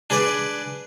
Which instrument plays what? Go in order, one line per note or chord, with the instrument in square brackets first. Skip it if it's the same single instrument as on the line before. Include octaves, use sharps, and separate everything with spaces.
[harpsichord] D4 G#4 B4 D5